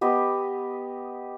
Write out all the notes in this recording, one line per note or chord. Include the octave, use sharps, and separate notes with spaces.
B3 G4 D#5